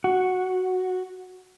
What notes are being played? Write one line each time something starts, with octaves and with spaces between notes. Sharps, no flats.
F#4